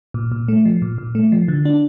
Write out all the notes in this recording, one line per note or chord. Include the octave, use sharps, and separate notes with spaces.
A#2
A#2
A3
F3
A#2
A#2
A3
F3
D3
D4